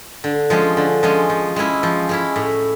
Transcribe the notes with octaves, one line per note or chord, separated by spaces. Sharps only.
D3
F3 G#3 C#4
D3
F3 G#3 C#4
F3
G#3 C#4 E4
F3
G#3 C#4 E4
A2